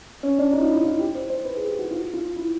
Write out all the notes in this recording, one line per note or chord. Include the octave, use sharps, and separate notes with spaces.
C#4
D4
D#4
F4
E4
F4
G4
C5
C5
B4
G#4
G4
F#4
F4
F4
E4